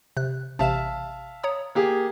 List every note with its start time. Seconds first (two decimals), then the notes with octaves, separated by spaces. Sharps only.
0.17 C3 F#6
0.59 A1 C3 E5 F5 A5 E7
1.43 C#5 A#5 D#6
1.75 A#3 G4 G#4